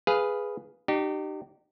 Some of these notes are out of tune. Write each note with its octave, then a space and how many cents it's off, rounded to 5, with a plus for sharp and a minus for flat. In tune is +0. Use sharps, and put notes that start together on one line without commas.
G#4 +0 B4 +0 F5 +0
D#4 -40 G4 -25